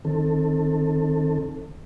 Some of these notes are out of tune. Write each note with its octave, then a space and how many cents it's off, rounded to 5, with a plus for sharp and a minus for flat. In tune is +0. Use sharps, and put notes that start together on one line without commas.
D#3 +0 C4 +30 A4 +20